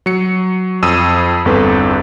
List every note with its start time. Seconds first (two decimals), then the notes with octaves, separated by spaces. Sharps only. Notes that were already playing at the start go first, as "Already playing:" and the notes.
0.06 F#3 C#7
0.83 F2 D#6 E6 D#7
1.45 G1 E2 C4 A4 B4